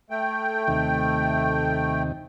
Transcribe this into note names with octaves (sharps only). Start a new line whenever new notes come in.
A3 G5
D#2 C3 D#3